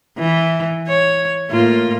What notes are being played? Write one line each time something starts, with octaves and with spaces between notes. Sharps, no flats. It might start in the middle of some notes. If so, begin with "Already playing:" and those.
E3
C#5
A2 A#3 F4